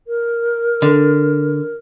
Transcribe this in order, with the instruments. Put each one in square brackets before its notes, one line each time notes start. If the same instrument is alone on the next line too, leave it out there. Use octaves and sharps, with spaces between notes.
[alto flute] A#4
[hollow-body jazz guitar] D3